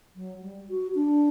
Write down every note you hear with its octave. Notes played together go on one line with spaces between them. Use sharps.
F#3
G3
F#4
D4